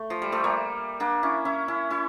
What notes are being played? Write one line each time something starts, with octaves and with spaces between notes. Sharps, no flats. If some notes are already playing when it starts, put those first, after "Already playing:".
Already playing: A3
F3
G3
F3 A3
G3 A#3
A#3 D4
C#4 E4
C#4 E4
C#4 E4
C#4 E4